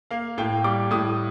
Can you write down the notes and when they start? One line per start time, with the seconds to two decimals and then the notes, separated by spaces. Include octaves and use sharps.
0.11 A#3 F5
0.38 A2 G5
0.64 G3 D6
0.91 A2 D#6